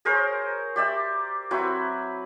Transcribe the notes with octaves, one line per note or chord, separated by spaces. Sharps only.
G#4 A#4 C5 C#5
G4 D5 E5
F#3 C4 E4 B4